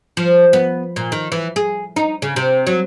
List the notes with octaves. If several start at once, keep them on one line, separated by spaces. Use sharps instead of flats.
F3
B3
A#2
D#3
E3
G#4
D#4
C#3
C3
F#3